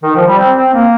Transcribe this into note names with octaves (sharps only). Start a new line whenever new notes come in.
D#3
F3
G3
C4
C4
A#3